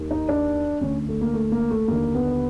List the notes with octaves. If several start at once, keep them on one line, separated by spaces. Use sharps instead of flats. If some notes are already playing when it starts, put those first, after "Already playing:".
Already playing: D#2 D#3
D#4
D4
D2 D3 C#4
A3
A#3
A3
A#3
A3
D#2 D3 A#3
B3